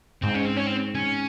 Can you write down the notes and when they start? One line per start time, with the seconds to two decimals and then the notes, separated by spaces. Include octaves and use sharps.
0.22 G#2 C4
0.34 C#4
0.45 C4
0.56 C#4
0.67 C4
0.95 C#4